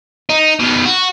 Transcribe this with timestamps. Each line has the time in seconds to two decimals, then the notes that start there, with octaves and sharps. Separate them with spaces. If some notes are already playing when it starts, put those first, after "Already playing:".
0.29 D#4
0.59 B2 D#3
0.86 F#4